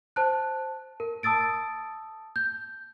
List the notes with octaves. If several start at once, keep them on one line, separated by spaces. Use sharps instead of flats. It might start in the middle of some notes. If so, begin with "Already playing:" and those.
C5 A5 F#6
A#4
A5 D#6 E6 A6 D7
G6